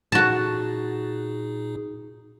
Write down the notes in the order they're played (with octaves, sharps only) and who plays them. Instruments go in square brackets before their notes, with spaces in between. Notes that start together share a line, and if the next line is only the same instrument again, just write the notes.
[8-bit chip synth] A#2 D#4 G#4 [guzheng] F#4 A5